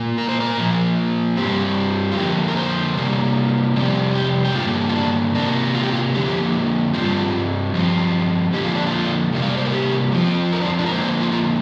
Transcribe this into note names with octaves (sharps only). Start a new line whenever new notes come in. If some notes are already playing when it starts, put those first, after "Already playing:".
Already playing: A#2 A#3
A#4
C5
A#4
A#2 F3 A#3
G2 G3 C4 G4
F4
F2 D3 A#3 G4
A#4
C5
C3 G3 A#3
F2 C3 G3 C4
G4
G4
G2 D3 A#3 F4
F4
D4
C3 A#3 D4
F4
G4
F4
F2 D3 A#3 G4
G2 G3 C4 F4
G2 F3 C4
F2 D3 A#3 G4
F4
D4
F4
C3 G3 A#3
F5
D5
C5
A#4
G4
F2 F3 C4
A#4
D4
F4
D4
A#4
F2 D3 A#3 C5
C5
F4
F4